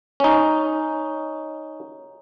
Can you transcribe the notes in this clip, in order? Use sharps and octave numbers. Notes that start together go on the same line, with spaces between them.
C#4 D#4